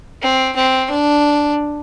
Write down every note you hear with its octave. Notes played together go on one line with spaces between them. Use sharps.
C4
C4
D4